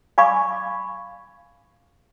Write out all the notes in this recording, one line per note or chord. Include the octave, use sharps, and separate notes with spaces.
D5 F5 G#5 B5 C#6 D6